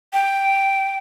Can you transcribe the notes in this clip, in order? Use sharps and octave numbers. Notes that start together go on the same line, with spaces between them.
G5